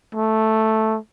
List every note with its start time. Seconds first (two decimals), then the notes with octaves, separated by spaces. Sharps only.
0.15 A3